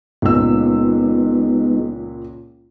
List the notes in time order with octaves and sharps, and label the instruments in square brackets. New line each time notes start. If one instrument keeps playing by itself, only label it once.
[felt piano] C#2 A#2 E6 [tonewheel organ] G#3 B3 D#4